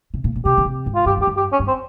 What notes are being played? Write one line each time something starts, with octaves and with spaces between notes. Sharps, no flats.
C3
A#2
A#2
C3 G4
C#3
C3
G#2
F4
G2 G4
F2
G4
G2
G4
C#4
G2
C4